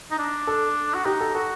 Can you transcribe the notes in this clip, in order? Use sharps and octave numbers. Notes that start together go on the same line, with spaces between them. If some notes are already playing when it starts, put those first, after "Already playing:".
D#4
D4
A4
F#4
D#4 G4
A4
F#4 A4